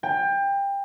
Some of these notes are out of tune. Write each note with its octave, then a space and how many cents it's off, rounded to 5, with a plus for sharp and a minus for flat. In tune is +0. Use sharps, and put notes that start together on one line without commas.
G5 +25